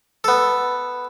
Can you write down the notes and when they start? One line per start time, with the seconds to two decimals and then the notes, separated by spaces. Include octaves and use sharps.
0.24 B3 A4